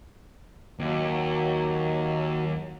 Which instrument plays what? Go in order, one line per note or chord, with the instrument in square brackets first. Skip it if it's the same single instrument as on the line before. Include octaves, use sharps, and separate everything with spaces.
[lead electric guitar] D#2 [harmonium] F#3